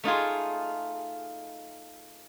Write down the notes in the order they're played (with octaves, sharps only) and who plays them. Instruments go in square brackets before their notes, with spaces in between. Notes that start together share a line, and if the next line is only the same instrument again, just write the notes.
[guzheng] A3 D#4 F4 G#4